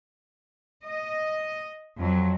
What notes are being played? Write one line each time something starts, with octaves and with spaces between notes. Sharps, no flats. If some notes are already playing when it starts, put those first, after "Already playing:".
D#5
F2 F#3